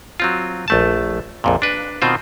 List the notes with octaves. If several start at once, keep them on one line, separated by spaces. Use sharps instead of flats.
F#3 C4 F4
A#1 A3 A5
A#1 F2 A#2
D4 B4
B2 D#3 C4 F4 C5